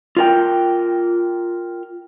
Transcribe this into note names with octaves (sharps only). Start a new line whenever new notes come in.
F4 A#4 G5